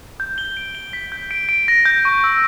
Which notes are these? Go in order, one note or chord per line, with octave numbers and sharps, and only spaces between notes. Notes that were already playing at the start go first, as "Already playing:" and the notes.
G6
G7
D7
G7
B6
G6
D7
D7
A#6
G6
C#6
E6